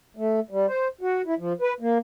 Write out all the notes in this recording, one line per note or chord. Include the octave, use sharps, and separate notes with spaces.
A3
G3
C5
F#4
E4
F3
B4
A#3